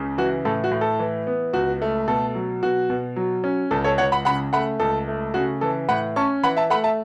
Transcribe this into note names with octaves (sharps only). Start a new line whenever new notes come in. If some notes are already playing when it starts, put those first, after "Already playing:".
Already playing: C#2 C#3
E3 F#4
A2 A4
F#4
A2
A4
E3
B3
C#2 F#4
A3
B2 A4
F#3
B2 F#4
B2
F#3
C#4
C#2 A4
A4 C#5
C#2 C#5 F#5
F#5 B5
C#3 F#5 B5
A3 F#5 B5
C#2 A4
A3
C#3 F#4
E3 A4
A2 F#5 B5
C#4 A5 C#6
E3 F#5 B5
E5 A5
A3 F#5 B5
E5 A5